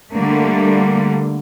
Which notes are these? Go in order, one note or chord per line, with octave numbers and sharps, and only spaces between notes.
D3 G3 A3 A#3